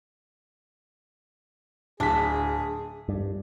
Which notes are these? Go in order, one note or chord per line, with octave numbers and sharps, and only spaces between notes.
D1 D4 G#4 B6
G2